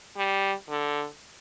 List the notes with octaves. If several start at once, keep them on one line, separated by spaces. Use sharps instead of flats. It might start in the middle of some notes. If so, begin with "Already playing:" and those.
G3
D3